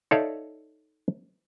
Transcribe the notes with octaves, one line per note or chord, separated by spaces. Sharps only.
D#4 A4 C#5 D5 E5 F5